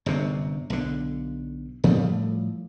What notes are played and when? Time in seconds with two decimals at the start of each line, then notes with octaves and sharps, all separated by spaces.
0.06 G1 F#2 C3
0.70 B1 D3
1.84 A2 F3 G3 A3